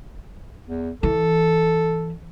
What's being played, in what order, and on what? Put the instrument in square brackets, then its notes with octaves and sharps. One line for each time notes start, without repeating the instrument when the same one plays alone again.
[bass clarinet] E2
[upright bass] E3 [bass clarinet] A4